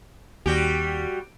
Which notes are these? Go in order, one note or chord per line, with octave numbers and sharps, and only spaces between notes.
D#2 G3 F#4 G4